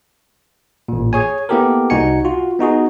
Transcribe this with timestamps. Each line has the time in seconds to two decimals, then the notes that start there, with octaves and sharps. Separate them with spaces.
0.88 A1 A#2
1.13 G#4 C#5 G#5
1.49 A#3 B3 E4 G4 A4 A#4
1.90 C2 D#4 F#4 G#5 C#7
2.25 F4 F#4
2.59 B3 D#4 F#4 G#4